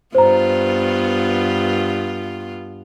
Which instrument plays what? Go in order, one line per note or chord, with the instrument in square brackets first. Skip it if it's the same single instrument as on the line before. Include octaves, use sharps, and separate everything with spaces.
[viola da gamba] G2 B3 F4 [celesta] C5 A#5